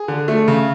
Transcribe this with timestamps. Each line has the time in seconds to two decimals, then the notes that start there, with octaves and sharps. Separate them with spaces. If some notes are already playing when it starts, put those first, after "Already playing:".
Already playing: G#4
0.08 D3
0.28 A3
0.48 C#3